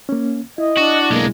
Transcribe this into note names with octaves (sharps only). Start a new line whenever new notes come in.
A#3 C#4
E4 D#5
D4 F#4
B1 G#3 A#3